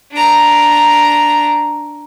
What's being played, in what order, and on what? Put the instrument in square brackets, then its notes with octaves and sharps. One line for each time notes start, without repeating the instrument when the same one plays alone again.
[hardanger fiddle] D4 A#5